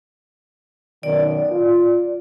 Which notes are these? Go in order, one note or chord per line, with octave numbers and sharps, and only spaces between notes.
F#2 B2 D#3 D5
F4